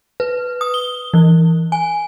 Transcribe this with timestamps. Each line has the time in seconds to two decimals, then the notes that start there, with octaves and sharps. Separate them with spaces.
0.20 B4
0.61 D#6
0.74 G7
1.14 E3
1.72 G#5